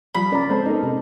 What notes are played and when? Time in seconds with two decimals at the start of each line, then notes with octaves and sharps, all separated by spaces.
0.15 F3 G3 B5
0.32 C#2 C#4 A#4 D5 A#5
0.50 G#3 C4 A4 C5
0.66 B3 D#4 A4 A#4 D#5
0.83 C3